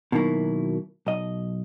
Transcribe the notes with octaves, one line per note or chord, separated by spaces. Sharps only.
B2 D#3 F#3 A#3 E4
B1 D#5